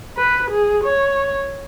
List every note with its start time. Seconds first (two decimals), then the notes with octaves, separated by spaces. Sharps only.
0.17 B4
0.51 G#4
0.85 C#5